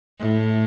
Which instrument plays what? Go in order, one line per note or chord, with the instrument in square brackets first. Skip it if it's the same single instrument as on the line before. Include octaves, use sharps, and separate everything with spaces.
[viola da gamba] A2